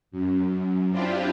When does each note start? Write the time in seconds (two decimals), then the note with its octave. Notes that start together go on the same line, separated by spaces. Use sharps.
0.11 F#2
0.91 C4 D4 E4 F4 G4